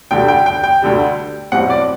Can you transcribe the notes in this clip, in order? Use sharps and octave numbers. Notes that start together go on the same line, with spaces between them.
D2 D3 G3 G5
G5
G5
G5
D2 D3 G3
B1 A2 G3 C4 F#5
D5